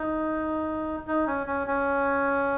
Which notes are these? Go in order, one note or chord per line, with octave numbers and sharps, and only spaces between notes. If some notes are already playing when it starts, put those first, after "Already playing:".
Already playing: D#4
D#4
C#4
C#4
C#4